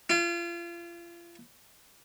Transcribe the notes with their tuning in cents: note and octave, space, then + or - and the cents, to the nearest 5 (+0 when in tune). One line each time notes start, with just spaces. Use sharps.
F4 -35